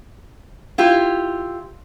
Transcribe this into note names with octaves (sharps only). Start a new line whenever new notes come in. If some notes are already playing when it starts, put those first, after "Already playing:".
E4 F4 G4